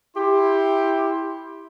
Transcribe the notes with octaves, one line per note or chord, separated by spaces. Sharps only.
E4 G4 C6